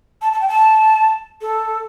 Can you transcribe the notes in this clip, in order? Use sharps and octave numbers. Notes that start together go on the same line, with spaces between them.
A5
A5
G5
A5
A4